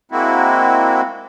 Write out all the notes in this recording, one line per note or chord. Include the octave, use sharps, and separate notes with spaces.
G#3 A#3 C4 E4 F#4